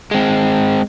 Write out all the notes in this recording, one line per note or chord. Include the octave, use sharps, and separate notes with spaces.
G#3 C4